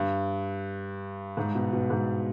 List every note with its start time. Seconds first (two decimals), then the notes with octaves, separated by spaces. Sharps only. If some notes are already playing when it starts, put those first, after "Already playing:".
Already playing: G2
1.37 G#2
1.55 B2
1.73 B2
1.90 G#2